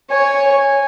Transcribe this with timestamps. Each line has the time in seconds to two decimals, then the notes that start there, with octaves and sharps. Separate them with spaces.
0.10 C#5 G#5